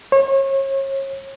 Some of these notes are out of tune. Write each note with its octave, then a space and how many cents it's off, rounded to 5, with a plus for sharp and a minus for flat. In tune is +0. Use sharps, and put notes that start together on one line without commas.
C#5 -35